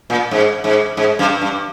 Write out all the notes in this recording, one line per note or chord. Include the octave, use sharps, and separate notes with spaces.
A#2
G#2
G#2
G#2
G2
G2